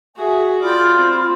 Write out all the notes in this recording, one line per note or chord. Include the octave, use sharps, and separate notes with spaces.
F#4 G#4 E5 G#5
F4 D5 G5 B5 F6
C4